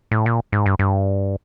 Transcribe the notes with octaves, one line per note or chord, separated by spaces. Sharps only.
A2
A#2
G#2
G2
G2